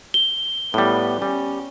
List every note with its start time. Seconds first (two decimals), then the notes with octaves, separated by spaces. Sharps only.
0.14 G7
0.74 A2 G3 B3
1.22 G3 C#4